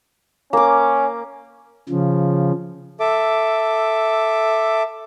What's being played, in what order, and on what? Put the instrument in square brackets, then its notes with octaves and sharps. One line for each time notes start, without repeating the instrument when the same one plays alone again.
[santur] A#3 D6 [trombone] C#4
[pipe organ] C#3 F3
[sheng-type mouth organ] A4 E5 D6